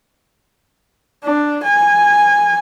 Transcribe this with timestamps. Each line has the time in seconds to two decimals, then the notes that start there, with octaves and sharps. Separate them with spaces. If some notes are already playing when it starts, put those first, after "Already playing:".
1.24 D4
1.64 G#5